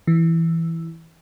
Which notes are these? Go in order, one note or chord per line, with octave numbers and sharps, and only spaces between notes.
E3